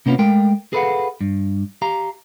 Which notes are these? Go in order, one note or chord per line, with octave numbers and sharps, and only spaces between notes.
C3 A#3 B3 C#4 E4 F4
G#3 A3 A#4 F5 G5
G#4 A4 B4 D5 F5 F#5
G2
G4 F5 A#5